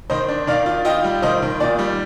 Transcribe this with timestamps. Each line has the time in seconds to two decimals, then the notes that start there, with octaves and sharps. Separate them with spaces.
0.10 D#3 C5 D#5
0.28 D4
0.47 D#3 D5 F5
0.66 F4
0.85 F4 D#5 G5
1.04 G3
1.22 D#3 C5 D#5
1.42 D#3
1.60 A#2 D5
1.79 G3